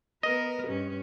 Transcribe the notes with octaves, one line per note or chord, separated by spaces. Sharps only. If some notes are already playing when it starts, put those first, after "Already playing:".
B3 A#4 B4 D#5
G2 C#4